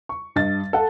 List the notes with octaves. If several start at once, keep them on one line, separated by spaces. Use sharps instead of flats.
C#6
G2 D#5 A6
A4 F#5 A5